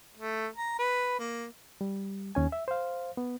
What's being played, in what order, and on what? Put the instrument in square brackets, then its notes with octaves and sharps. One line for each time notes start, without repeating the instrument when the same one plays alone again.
[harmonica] A3
A#5
B4
A#3
[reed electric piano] G3
D#2 C#4 G#5
E5
C5 F5
B3